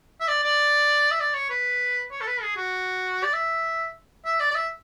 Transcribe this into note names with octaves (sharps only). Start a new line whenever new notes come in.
E5
D5
D5
E5
D5
C#5
B4
C#5
A4
B4
G#4
F#4
D5
E5
E5
D5
D5
E5